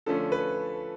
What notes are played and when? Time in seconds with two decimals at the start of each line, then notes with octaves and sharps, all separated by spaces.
0.06 D3 F3 A3 C#4 A4
0.32 B4